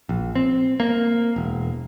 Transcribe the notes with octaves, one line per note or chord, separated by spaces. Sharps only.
A#1
C4
A#3
E1